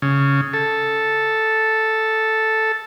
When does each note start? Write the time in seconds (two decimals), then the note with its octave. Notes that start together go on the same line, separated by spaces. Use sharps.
0.02 C#3
0.53 A4